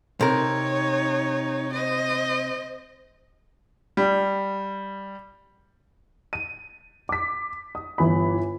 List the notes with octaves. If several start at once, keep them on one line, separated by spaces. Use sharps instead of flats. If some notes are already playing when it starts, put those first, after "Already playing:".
C3 D#4 A#4 C#5
C5 D#5
G3
D#7
D6 B6
D#6
G1 E3 B5